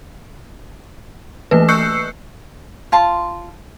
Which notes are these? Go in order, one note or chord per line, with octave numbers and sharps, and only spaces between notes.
E3 A3 A#3 B4
C#6 E6 F#6 G6 C7 C#7
F4 A5 C6